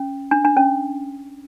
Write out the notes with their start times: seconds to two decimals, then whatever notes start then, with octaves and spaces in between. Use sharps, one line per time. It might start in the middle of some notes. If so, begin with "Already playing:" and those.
Already playing: C#4
0.31 D4
0.45 D4
0.57 C#4